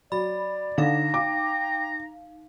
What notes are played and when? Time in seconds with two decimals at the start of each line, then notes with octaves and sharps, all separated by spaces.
0.12 F#3 D5 B5
0.78 D3 D#4 F5 A#5
1.14 G5 D6